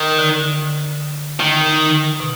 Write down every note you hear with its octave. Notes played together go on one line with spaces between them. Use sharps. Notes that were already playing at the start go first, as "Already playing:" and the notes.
Already playing: D#3
D3
D#3
B2